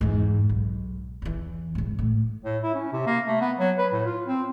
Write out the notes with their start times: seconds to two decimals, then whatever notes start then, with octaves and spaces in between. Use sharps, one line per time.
0.01 E2 G#2
0.49 B1
1.22 E2 E3
1.75 G#2 C#3
1.99 A2
2.43 A2
2.63 E4
2.75 C#4
2.93 C3
3.06 A#3
3.27 A3
3.41 B3
3.59 F#3
3.78 B4
3.92 A2
4.06 F4
4.27 C4